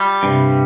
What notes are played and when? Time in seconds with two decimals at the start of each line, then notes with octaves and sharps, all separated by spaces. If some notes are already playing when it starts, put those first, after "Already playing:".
Already playing: G3 F4
0.22 G2 C3